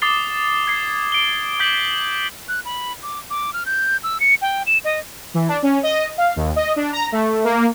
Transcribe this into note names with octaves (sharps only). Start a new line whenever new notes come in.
D6 D#6 A6 C7 G7
G#6 C7
D7 G7
D6 G6 B6 F#7
F#6
B5
D6
D6
F6
G6
E6
C#7
G5
E7
D#5
E3
D4
C#4
D#5
F5
D#2
D#5
D4
A#5
A3
A#3